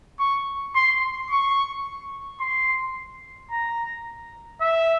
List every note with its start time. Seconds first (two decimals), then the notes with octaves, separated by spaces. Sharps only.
0.19 C#6
0.75 C6
1.31 C#6
2.41 C6
3.51 A#5
4.61 E5